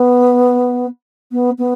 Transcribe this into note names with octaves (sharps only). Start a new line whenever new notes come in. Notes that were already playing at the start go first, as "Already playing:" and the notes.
Already playing: B3
B3
B3